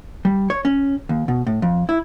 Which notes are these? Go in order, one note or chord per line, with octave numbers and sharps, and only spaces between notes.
G3
C#5
C#4
D#2
B2
A2
F2
E4